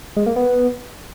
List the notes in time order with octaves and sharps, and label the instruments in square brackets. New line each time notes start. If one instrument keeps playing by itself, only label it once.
[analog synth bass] G#3
A#3
B3